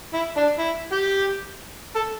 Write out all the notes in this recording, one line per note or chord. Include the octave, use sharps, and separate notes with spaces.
E4
D4
E4
G4
A4